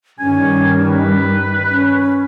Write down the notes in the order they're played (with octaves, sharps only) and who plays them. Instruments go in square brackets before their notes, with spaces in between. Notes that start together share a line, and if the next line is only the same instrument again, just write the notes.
[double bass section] G2 D#3 G3 [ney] C#4 [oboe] G#5
[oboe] B4
[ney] C#4